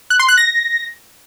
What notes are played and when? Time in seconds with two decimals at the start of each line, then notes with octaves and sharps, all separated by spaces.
0.10 F#6
0.19 C6
0.28 F#6
0.37 A#6